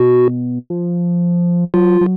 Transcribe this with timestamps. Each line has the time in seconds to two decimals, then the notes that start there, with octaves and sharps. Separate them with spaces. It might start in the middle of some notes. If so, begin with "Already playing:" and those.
Already playing: B2 F#4
0.70 F3
1.74 F#3 F4
2.01 F#3